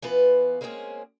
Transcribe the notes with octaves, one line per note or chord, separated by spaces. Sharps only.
E3 B3 F4 B4
G#3 A#3 C4 C#4 E4 G#4